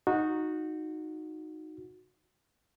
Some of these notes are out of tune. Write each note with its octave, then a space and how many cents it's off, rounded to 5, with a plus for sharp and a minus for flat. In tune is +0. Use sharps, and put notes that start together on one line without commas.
D#4 +0 F#4 -15